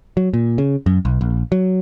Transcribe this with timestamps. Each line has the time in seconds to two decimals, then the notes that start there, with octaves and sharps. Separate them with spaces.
0.17 F#3
0.33 A#2
0.58 C#3
0.86 F#2
1.05 B1
1.21 A#1
1.52 F#3